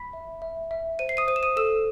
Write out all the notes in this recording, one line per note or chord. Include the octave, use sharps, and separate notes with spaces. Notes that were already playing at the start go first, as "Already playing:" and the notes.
Already playing: B5 B6
E5
E5
E5
C5 D#7
C7
D#6 D#7
C5 D#7
E7
D#6 D#7
A4 E6 E7